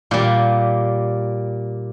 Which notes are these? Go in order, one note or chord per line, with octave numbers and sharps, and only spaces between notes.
A#2 G3